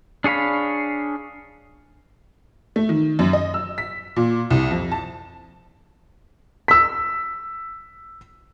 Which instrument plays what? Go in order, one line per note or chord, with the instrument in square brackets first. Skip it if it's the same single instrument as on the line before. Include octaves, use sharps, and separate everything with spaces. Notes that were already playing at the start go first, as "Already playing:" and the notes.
[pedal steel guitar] D4 G#4 C#5 F5 B5
[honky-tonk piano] A3
D#3
F#2
D#5
E6
B6
A#2
C2
F2
A5
[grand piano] E6 B6